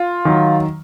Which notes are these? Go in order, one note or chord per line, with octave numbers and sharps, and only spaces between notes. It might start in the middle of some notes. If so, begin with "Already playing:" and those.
Already playing: F4
D#3 F#3